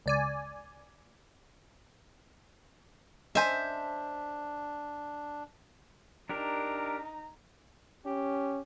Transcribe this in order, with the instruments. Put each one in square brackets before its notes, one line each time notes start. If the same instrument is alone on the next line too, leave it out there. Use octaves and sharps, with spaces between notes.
[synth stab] C#2 D5 G#5
[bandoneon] D4 [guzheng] C5 E5 [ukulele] D#5 G#5 A5
[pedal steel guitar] D4 G4 A#4 [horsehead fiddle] D#4 A#5
[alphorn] C#4 [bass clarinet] G4